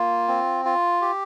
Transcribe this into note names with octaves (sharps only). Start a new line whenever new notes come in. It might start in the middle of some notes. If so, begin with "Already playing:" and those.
Already playing: A#3 F4
C4
F4
G4